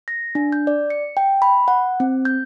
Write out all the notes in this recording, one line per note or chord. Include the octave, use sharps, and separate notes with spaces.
A#6
D4
G6
D5
C#7
G5
B5
F#5
C4
G6